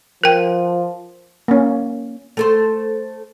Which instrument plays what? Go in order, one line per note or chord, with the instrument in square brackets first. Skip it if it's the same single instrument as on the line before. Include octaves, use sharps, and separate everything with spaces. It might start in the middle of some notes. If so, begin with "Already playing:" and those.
[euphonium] F3 [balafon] A#4 G5
[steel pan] A#3 C#4
[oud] A3 A4 C5